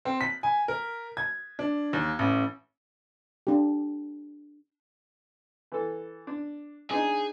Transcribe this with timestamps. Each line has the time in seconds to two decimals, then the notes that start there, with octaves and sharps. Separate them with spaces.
0.05 C4
0.21 B6
0.43 G#5
0.68 A#4
1.17 G#6
1.59 D4
1.93 D#2
2.19 A1
3.47 D4 G4
5.72 E3 A4
6.27 D4
6.91 D4 D#4 G#4